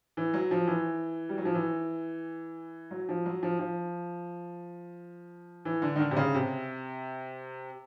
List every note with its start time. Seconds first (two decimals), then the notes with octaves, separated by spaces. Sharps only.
0.17 E3
0.34 F#3
0.51 F3
0.67 E3
1.29 G3
1.38 F#3
1.45 F3
1.54 E3
2.91 F#3
3.09 F3
3.26 F#3
3.43 F3
3.59 F3
5.65 E3
5.82 D3
5.96 D#3
5.99 D3
6.11 C3
6.16 C#3
6.34 C3